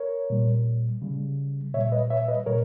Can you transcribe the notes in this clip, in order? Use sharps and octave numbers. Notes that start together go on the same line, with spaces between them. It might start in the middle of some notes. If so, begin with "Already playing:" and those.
Already playing: A#4 C#5
A#2 G3
C#3 G3
A#2 G3 C#5 E5
B4 D#5
C#5 E5
B4 D#5
A#2 G3 A#4 C#5